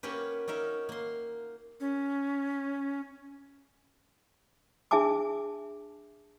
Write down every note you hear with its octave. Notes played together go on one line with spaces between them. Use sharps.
A#3 C#4 F#4 G4 B4
C#4 D#4 A#4 E5
A#3 C6
C#4
D4 G#4 E5 G#5 A5 D6